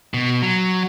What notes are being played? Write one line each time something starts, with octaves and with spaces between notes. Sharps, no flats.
B2
F#3